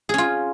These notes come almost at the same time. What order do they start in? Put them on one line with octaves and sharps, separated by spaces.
G#4 C#4 F4